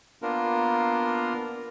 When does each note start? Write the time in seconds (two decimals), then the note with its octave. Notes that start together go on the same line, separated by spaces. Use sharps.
0.22 A#3 B3 D4 F4 A#4